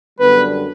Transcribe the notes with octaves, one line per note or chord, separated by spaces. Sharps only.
F#2 D3 G3 B3 B4